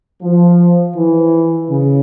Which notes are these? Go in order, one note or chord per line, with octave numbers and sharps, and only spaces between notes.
F3
E3
C#3